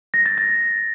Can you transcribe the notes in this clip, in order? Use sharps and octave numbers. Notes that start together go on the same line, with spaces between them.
A#6
A6
A6